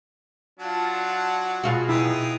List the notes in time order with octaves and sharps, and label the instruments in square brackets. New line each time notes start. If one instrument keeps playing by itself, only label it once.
[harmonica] F#3 D4 F#5 [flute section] F4 A5
[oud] B2 F4 F#4 [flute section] G#4
[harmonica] B3 D#4 G5 [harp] E4